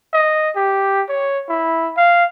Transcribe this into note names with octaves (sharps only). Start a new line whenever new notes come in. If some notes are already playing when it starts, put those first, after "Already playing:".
D#5
G4
C#5
E4
F5